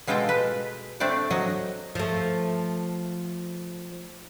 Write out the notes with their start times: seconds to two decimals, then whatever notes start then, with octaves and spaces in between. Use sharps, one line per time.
0.07 B2 G#3 F4 A4 G5
0.29 B4
1.00 A3 C4 D4 D5
1.31 F#3 F#4 D#5
1.95 F3 A3